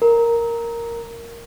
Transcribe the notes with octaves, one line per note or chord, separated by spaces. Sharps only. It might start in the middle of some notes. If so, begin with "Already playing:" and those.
A#4